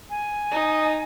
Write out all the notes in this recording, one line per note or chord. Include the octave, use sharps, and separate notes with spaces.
G#5
D#4